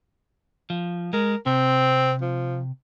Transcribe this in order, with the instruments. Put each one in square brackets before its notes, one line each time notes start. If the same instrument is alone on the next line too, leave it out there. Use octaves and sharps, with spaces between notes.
[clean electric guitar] F3
[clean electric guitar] G#3 [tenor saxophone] A#4
[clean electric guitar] C3 [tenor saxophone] C4
[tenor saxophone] F3